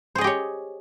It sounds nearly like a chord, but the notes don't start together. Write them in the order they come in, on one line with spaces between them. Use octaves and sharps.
C5 G#4 D#5 G4 C#5